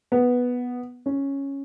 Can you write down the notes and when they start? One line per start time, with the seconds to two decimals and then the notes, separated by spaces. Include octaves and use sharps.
0.12 B3
1.06 C#4